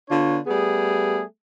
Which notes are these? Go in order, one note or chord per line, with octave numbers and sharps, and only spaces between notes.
D3 B3 D4 F4 C#5
G3 A3 B3 G#4